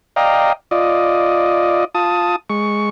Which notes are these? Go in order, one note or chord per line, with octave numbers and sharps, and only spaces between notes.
D5 D#5 F5 G5 A#5
F4 D5 D#5
F4 A5 D#6
G#3 C#6